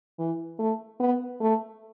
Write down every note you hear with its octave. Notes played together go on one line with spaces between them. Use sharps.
E3
A3
B3
A3